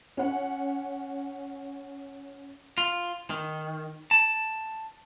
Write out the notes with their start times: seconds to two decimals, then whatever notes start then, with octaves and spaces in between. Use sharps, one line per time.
0.17 C#4 F#5
2.78 F4
3.30 D#3
4.11 A5